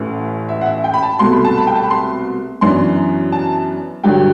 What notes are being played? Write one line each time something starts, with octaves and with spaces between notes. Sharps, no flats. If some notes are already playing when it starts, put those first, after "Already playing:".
Already playing: A1 A2 E3
E5
F#5
E5
G5
B5
A5
C2 B2 A3 C6
B5
A5
B5
G5
A5
B5
C6
F#2 E3 B3 D4 C6
A5
G2 D3 F#3 G5